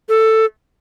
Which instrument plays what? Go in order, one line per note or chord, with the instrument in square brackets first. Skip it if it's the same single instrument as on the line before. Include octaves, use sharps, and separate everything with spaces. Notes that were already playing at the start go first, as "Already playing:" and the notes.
[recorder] A4